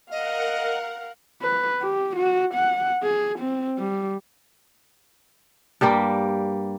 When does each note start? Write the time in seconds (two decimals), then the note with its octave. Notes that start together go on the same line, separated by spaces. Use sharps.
0.11 A#4 D#5 F5 F#5
1.42 B4
1.81 G4
2.16 F#4
2.54 F#5
3.03 G#4
3.39 C4
3.78 G3
5.81 G2 G3 A#3 G4